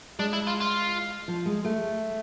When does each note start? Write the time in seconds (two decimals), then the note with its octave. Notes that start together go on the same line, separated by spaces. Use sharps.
0.19 G#3 D4
0.33 E4
0.47 F4
0.60 F4
1.28 F3
1.46 G#3
1.65 A3